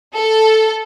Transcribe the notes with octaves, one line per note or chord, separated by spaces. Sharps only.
A4